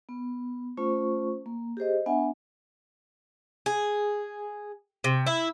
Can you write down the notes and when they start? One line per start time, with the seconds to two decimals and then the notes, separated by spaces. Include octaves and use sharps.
0.09 B3
0.77 A3 C#4 F4 C5 C#6
1.46 A#3
1.77 G4 G#4 C5 D#5
2.06 B3 D4 E5 F#5 G#5
3.66 G#4
5.04 C3
5.27 E4